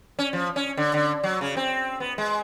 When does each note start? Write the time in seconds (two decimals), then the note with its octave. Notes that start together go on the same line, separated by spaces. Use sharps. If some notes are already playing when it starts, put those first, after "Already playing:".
0.19 C#4
0.33 F3
0.56 C#4
0.77 D3
0.94 D3
1.23 F#3
1.41 C#3
1.57 C4
2.00 B3
2.18 G#3